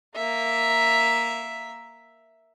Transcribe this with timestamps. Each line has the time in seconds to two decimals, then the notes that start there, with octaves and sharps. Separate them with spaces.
0.16 A#3 E5